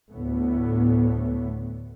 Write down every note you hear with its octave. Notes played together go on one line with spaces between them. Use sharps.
D2 A2 B3